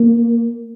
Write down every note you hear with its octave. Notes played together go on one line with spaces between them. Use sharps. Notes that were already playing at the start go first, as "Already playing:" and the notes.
Already playing: A#3